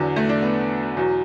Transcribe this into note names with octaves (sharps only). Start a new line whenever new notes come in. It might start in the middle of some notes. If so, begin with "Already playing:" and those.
Already playing: E2 D3 F#3
A3
D4
B3
E2 B2 F#3